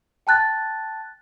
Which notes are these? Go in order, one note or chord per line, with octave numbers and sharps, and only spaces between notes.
G5 A5 F#6 A6